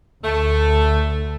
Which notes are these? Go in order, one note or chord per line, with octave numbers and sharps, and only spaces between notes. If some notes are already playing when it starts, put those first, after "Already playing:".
D2 A3